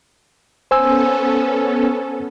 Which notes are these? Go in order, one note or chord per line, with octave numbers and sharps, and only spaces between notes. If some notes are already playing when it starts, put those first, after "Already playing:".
B3 C#4 A4 C5 G#5 E6